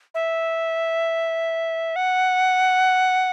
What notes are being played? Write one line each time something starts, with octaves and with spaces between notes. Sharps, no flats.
E5
F#5